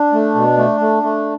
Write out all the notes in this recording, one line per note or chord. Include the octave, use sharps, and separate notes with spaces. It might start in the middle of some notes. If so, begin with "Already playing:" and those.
Already playing: D4
A3
B2
A3
A3
A3